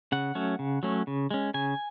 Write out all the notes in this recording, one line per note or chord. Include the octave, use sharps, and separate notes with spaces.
C#3 F#5
F#3 A3 C#4
C#3
F#3 A3 C#4
C#3
G#3 C#4
C#3 G#5